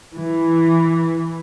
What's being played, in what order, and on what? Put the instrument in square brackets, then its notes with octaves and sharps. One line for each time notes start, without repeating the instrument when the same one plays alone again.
[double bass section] E3